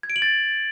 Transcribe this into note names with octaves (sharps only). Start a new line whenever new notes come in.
G#6
D7
F#7
A6